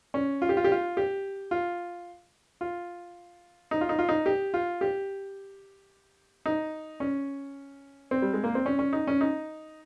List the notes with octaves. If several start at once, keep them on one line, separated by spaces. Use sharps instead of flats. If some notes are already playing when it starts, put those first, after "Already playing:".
C#4
F4
G4
F4
G4
F4
G4
F4
F4
D#4
F4
D#4
F4
D#4
G4
F4
G4
D#4
C#4
C4
G3
G#3
A#3
C4
C#4
C#4
D#4
C#4
D#4